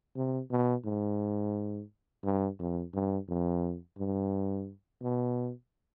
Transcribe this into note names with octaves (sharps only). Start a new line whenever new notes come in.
C3
B2
G#2
G2
F2
G2
F2
G2
B2